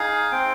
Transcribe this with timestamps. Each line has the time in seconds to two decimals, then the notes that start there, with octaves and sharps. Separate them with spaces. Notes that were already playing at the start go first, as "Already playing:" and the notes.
Already playing: D#4 G#4 F5
0.31 C4 G5